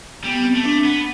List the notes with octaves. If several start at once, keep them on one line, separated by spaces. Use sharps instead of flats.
G3 B3
C4
A3
D4
B3